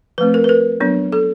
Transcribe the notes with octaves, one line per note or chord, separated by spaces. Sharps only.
F3 A3 C4 B4
A#4
B4
A#4
F#3 B3 D4
A4